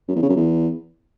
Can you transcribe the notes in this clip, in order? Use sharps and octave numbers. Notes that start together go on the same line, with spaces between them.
F#2
E2
C#3
F#2
E2